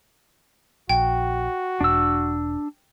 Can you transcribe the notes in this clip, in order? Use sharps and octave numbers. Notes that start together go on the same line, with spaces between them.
A#1 F#4 G5
E1 D4 E6